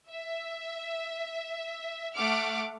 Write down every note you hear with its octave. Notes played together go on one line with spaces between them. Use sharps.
E5
A3 F#5 D6 F6